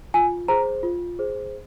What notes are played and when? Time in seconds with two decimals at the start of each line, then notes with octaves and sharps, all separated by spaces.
0.14 F4 G#5
0.48 G#4 C5 A#5
0.83 F4
1.19 G#4 C5